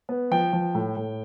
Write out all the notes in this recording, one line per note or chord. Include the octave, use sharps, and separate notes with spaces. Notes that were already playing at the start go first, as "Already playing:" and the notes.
B3
F3 G5
F3
A2
A2